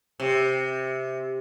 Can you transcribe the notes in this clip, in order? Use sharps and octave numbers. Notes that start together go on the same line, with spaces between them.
C3